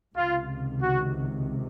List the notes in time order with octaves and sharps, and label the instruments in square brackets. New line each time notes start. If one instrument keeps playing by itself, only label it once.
[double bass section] C#2 C3 D#3 [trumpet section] F4
[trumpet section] F#4